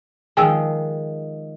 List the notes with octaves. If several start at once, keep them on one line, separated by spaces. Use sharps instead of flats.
D#3 F3 G#3 G#4 G5 G#5 E6